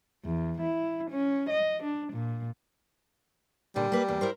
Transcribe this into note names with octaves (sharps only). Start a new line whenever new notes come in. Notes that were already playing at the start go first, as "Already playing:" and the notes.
E2
E4
C#4
D#5
D4
A#2
A#2 D3 G3
A#3 B4
E2 A#3
E4 A#4 C5